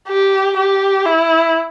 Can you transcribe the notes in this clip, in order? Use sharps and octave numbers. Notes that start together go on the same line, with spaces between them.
G4
G4
E4